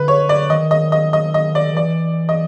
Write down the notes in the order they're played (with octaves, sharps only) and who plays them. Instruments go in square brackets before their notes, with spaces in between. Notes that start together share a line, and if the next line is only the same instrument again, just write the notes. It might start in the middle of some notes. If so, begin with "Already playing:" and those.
Already playing: [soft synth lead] D3 [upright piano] B4
[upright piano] C#5
D5
[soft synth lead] D#3 [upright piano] D#5
[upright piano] D#5
D#5
D#5
D#5
D5
[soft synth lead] D#3
[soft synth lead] E3 [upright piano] D5
[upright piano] D#5